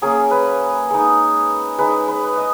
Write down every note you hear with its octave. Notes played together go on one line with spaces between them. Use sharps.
F#3 A#3 C#4 G#4
B4
G#3 D#4
G#3 D#4 B4
B4
D#5